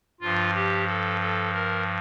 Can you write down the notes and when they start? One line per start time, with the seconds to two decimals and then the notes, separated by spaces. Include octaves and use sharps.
0.21 G2 F3 F4
0.55 G4
0.88 A4
1.21 A4
1.54 A#4